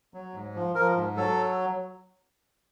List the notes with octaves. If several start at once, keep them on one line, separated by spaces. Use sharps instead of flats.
F#3
G#2
F3
F3 A#4
G#2
F#3 A4